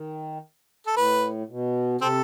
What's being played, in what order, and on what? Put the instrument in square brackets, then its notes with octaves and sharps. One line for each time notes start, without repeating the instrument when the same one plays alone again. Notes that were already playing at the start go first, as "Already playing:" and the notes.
Already playing: [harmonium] D#3
[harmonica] A4
[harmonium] A2 [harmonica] B4
[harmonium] B2
[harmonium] C3 [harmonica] C4 A4